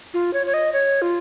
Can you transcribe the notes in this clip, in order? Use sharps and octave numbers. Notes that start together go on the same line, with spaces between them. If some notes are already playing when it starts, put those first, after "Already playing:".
F4
C#5
C#5
D#5
C#5
F4